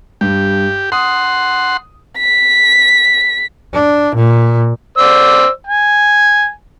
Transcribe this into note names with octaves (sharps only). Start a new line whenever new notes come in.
G2 G4
F#5 C6 D#6
B6
D4
A#2
C5 D5 E6
G#5